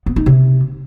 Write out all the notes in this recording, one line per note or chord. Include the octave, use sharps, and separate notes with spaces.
B3
D#4
C3